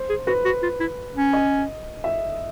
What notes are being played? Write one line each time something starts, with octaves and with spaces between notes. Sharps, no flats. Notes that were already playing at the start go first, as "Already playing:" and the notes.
Already playing: C5
G#4
F#4 B4
F#4
F4
E4
C#4
D#5
E5